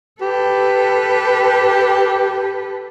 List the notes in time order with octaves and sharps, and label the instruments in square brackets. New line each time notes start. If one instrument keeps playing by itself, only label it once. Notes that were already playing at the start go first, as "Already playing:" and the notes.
[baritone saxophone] G4 [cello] A4 B4